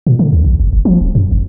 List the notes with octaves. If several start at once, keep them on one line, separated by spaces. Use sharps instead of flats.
A#2
D3
D2
A#1
F#1
F#1
F3
D1
F#2
G1